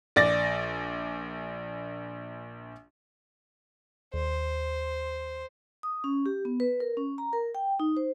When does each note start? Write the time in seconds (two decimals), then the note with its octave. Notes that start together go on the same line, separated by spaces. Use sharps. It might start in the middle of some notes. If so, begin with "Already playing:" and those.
0.16 A#1 D5 A6 A#6
4.14 D#2 C5
5.83 D#6
6.04 C#4
6.26 G4
6.45 B3
6.60 B4
6.80 A#4
6.97 C#4
7.18 A#5
7.33 A#4
7.55 G5
7.80 D#4
7.97 C5